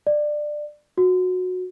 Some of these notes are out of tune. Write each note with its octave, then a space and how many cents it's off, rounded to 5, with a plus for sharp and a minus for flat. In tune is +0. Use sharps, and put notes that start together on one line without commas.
D5 +20
F#4 -15